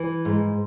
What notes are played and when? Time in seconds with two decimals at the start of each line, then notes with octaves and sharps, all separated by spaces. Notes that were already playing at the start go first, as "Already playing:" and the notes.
Already playing: E3
0.25 G#2